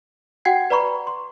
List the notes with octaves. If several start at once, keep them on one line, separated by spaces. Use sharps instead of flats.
F#4 F#5 G5 G#6 C7
B4 D5 A#5 B5 C#6
C6